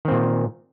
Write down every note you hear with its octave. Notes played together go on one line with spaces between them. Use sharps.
A#2 D#3 C4